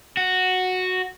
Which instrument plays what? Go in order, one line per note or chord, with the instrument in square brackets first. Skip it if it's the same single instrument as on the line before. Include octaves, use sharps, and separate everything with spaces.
[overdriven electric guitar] F#4